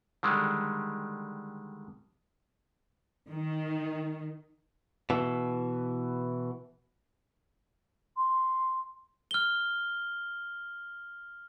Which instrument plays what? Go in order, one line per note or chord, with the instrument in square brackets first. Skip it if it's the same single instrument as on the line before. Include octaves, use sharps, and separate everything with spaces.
[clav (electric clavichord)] D3 D#3 G3 G#3
[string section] D#3
[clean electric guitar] B2 E3
[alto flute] C6
[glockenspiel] F6 G7